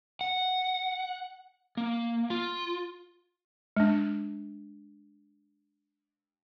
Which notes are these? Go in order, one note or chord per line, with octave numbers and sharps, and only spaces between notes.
F#5
A#3
F4
G#3 D4